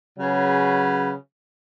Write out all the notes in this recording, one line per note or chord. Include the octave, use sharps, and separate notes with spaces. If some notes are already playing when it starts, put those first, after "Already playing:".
C#3 F#3 C#4 G#4 B4